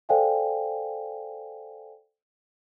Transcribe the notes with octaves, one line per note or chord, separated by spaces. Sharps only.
A4 C5 D5 F5 G5 G#5